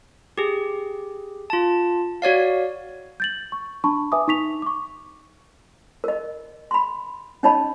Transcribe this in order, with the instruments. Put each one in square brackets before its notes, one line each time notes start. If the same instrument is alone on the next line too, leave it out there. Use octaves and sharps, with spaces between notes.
[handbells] G4 G#4
F4 A5
F#4 C#5 D5 F5
[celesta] G6 A6 F#7
C#6
D4 A5 B5 C#6
B4 E5 G#5 D6 D#6
D#4 C#6 B6 F7
C#6 D6
[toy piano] A#4 D#5
B5 C6
C#4 D#4 C#5 D#5 A5 B5